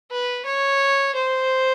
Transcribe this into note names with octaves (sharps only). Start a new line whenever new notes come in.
B4
C#5
C5